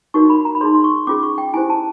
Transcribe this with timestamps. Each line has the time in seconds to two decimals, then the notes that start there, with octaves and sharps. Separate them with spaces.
0.14 D#4 F#4 A#4 C#5 C#6
0.30 B5
0.45 A#5
0.55 B5
0.61 D#4 G#4 C#5 C6
0.75 C6
0.84 C#6
1.07 C#4 F4 G#4 D6
1.23 C#6
1.38 G5
1.54 E4 G4 C5 G#5
1.70 A5